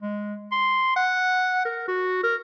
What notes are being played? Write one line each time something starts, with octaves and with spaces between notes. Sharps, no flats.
G#3
C6
F#5
A#4
F#4
A#4